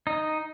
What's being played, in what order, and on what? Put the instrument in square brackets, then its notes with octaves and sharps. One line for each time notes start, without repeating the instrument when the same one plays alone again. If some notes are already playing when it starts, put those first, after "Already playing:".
[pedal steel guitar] D#4